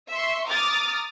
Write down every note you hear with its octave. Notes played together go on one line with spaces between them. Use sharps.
E5 C6 C#6
A#5 D6 D#6 F6 A6